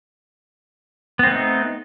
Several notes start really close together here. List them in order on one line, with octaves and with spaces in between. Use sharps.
B3 C4 A3 D#4